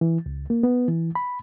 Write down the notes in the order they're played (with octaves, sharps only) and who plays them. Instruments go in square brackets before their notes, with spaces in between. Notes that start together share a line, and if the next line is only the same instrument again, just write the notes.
[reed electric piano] E3
C#2
A#3
B3
E3
B5